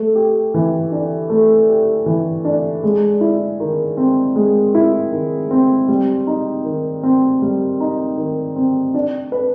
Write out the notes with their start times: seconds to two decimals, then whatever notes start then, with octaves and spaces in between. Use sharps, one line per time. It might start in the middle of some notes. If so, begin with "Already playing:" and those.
Already playing: A3
0.15 G4
0.54 E3
0.92 D4
1.30 A3
1.69 G4
2.06 E3
2.45 D4
2.84 G#3
3.21 E4
3.60 D#3
3.97 C4
4.36 G#3
4.75 E4
5.12 D#3
5.51 C4
5.88 G3
6.27 D#4
6.65 D#3
7.03 C4
7.42 G3
7.80 D#4
8.17 D#3
8.56 C4
8.94 D4
9.32 B4